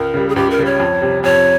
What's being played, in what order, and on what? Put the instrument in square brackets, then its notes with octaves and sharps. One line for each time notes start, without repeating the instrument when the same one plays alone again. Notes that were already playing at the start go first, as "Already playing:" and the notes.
Already playing: [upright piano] C#2 [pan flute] A#4
[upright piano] C#3 G3
[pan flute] G#4
[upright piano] C#2 [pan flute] G4
[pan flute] A#4
[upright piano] C#3 G3
[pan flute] C#5
[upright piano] F2
C3 G3
[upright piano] F2 [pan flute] C#5